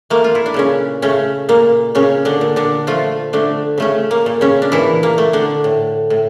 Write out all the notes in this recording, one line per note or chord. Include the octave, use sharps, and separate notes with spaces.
A3 A#3
F4
E4
D4
A#2 C#3 C#4
C#3 A3 C#4
A#2 A#3
A#2 C#3 C#4
D3 D4
A#2
D3 D4
F3 A3 F4
D3 A3 D4
C#3 A3 C#4
A#3
A#2
C#3 C#4
D4
A#2 E3 E4
A#3
A3
D3 D4
A2
A2